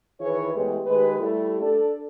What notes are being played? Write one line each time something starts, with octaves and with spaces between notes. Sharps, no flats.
D#3 E3 E4 G#4 B4 C#5
E2 G#3 A3 G4 B4
D#3 G#3 G4 B4
G3 A3 E4
D4 A4 D5